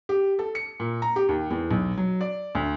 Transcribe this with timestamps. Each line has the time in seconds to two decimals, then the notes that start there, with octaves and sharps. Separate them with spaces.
0.09 G4
0.39 A4
0.55 C#7
0.80 A#2
1.02 A#5
1.16 G4
1.29 D#2
1.50 E2
1.71 B1
1.97 F#3
2.21 D5
2.55 D2